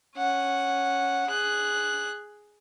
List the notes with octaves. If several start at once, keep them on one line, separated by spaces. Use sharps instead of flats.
C#4 F#5
G#4 F#6